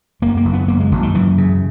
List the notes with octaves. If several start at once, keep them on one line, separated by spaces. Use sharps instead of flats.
F#1 A#3
A#3
F#1
B3
F#1 A#3
G#3
F#1 F#3
D#3
F#2 E3
C#3